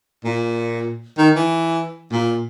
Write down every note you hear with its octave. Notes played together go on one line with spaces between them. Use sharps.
A#2
D#3
E3
A#2